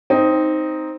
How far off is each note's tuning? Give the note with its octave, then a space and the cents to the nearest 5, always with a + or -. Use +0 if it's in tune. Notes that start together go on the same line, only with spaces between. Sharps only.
C4 +0 D#4 +5